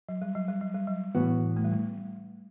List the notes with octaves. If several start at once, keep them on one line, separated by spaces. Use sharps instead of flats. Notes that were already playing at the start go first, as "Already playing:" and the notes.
F#3
G3
F#3
G3
F#3
G3
F#3
A2 E3 B3 F#4
A3
G3
A3